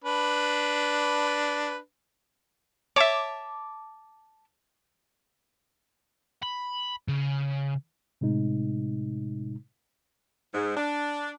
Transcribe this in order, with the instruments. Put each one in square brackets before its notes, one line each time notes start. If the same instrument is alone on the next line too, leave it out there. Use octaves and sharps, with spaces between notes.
[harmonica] D4 B4
[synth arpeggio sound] C#5 E5 [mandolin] A5 D6
[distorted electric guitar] B5
C#3
[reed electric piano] A2 C3 G#3 D#4
[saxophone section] G#2
D4